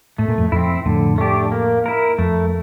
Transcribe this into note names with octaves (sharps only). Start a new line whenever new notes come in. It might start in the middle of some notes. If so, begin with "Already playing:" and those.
A2 A3
A#2
F2 A2
F2 C4 E4
F2 A2 D3
A3 D4 G4
A#3
E4 A#4
F2 A3